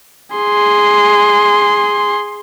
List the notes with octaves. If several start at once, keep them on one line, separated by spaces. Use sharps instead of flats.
G#4 C6